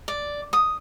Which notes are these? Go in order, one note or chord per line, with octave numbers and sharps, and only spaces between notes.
D5
D#6